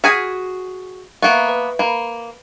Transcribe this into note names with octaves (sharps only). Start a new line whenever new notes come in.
F#4 G#4 G#5 F6 G#6 B6
A#3 B3 E5 F#5 C#6
B4
A#3 B5